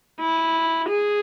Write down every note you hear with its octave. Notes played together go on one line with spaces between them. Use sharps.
E4
G#4